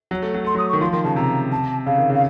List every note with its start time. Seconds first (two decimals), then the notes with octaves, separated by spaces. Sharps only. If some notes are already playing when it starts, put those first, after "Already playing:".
0.11 F#3
0.22 A3
0.34 F#3
0.45 A3 C6
0.55 F#3 D#6
0.69 C#6
0.73 D#3
0.81 F3 C6
0.92 D#3 C6
1.04 C#3 A5
1.16 C3 A#5
1.52 A5
1.86 C#3 F5
1.98 D#3
2.10 C#3 F5